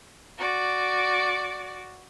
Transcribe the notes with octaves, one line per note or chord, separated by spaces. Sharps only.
F#4 D5